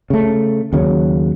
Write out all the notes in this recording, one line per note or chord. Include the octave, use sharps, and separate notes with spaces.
C#3 A3
D#2 C#3 F#3